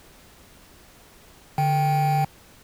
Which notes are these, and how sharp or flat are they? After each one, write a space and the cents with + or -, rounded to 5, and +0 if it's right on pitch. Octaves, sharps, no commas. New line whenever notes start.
D3 +0 G5 +0